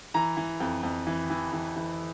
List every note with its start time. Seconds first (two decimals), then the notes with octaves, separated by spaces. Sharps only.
0.14 E3 A#5
0.37 E3
0.60 F2
0.83 F2
1.07 E3
1.30 E3
1.53 E3
1.76 E3